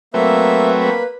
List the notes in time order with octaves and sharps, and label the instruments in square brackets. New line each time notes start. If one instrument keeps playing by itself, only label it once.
[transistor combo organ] F#3 A3 C4 [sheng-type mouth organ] A#3 E5 [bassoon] B4
[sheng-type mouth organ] A#3 B5